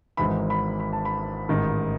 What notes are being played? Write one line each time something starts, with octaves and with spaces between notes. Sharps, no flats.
G#1 G#2 E3 B5
B5
B5
A5
B5
A1 G#2 D#3